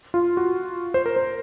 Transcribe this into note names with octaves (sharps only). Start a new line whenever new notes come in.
F4
F#4
C5
A#4
C5